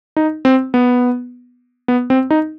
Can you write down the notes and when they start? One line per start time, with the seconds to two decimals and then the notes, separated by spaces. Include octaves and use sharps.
0.16 D#4
0.45 C4
0.74 B3
1.88 B3
2.10 C4
2.30 D#4